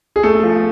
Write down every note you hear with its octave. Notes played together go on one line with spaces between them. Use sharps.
G#4
A3 A4
F3